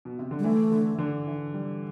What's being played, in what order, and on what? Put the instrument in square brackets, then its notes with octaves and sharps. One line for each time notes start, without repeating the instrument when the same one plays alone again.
[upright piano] B2
C3
D3
[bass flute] G3
[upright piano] E3 [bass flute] A3
[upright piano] D3
D3
E3
G3